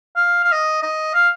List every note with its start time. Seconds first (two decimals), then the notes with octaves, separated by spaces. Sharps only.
0.16 F5
0.44 F5
0.52 D#5
0.82 D#5
1.14 F5